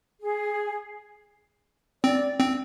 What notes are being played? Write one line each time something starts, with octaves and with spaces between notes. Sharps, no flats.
G#4
C4 D5
C4